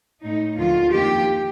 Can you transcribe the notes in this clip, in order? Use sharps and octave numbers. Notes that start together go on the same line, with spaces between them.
A2 A3 D#4
D2 D3 F3 A#3 F4
F2 D#3 A#3 G4